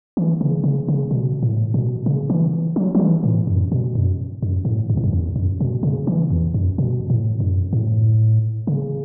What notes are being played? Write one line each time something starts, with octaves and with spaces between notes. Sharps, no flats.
E3
C#3
C#3
C#3
B2
A2
B2
C#3
E3
F#3
F#3
E3
A2
F#2
B2
F#2
F#2
A2
F#2
A2
F#2
E2
F#2
B2
C#3
E3
E2
F#2
B2
A2
F#2
A2
C#3